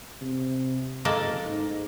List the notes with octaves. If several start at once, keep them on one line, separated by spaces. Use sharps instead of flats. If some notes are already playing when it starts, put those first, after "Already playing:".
C3
F#1 G#3 A#3 A4
G#2